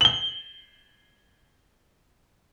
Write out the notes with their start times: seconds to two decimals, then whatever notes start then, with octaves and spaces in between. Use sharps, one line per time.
0.01 F#7 G7